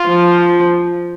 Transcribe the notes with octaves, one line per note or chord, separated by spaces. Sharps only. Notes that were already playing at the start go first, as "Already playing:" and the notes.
Already playing: F4
F3